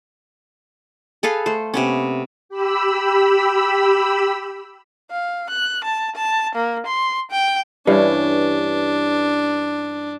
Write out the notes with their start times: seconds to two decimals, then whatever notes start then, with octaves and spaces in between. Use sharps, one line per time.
1.23 G#4 A4 B4 F5
1.46 A3 C5
1.74 C3 B3 C#4
2.49 G4 B5 E6
5.11 F5
5.50 F#6
5.84 A5
6.16 A5
6.55 A#3
6.86 C6
7.31 G5
7.87 G2 E3 C#4 D4